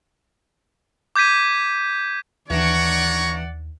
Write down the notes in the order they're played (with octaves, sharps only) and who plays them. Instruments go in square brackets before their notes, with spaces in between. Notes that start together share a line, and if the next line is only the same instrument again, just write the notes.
[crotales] D6 G6 G#6 B6 D#7
[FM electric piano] D#2 [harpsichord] E3 D4 [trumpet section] C#5 A#5 C#6 [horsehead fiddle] D5 F#5